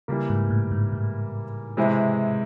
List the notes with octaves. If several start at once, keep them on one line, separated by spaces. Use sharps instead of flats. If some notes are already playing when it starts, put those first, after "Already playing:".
C#3 E3 G3 A#3
G#2
A2
G#2
A2
C3 E3 G#3 C4 E4